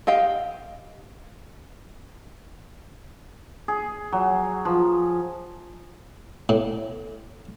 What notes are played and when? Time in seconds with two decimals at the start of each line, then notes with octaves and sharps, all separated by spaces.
0.07 G4 D#5 F5 G5
3.68 G#4
4.12 F#3
4.65 F3
6.49 A2